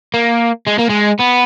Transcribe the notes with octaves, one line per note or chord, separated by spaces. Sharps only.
A#3
G#3
A#3
G#3
B3